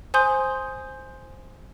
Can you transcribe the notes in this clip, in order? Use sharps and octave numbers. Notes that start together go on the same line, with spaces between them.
C5 G#5 C6 D#6 G6